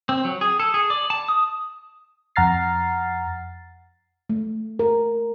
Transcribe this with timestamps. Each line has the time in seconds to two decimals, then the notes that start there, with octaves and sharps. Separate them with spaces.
0.09 C4
0.25 F#3
0.41 G#4
0.60 A4
0.74 G#4
0.90 D5
1.10 A5
1.28 D#6
2.36 F2 F#5 A#5 F6 A6 C7
4.30 A3
4.79 A#4